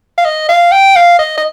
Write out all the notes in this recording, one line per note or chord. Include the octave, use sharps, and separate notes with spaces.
F5
D#5
F5
G5
F5
D#5
D#5